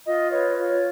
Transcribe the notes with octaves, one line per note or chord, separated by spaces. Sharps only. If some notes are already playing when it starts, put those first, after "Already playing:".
F4 D#5
B4 C#5
F4 C#5